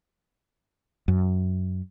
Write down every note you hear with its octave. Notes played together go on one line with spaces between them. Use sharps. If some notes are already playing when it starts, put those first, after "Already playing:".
F#2